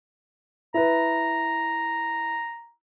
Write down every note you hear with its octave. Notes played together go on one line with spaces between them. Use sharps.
E4 B4 A#5